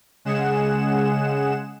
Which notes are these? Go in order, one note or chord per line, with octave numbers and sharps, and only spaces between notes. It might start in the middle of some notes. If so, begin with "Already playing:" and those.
C#3 G#3 G#4 F#5 E7